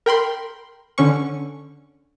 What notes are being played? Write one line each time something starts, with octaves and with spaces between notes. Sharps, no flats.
A#4 G5 B5 C6
D3 C#4 C#6